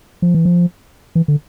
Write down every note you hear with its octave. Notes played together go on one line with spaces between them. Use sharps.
F3
E3
F3
E3
D3